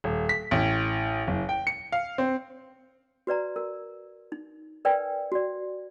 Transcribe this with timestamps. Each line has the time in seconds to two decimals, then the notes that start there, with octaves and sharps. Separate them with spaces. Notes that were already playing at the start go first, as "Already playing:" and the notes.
0.04 D#1
0.29 B6
0.51 A1
1.27 F#1
1.49 G5
1.67 C#7
1.92 F5
2.18 C4
3.27 F#4 B4 D5 A#5
3.56 A#4
4.32 D#4
4.85 A#4 B4 D5 G5 G#5
5.32 F#4 D5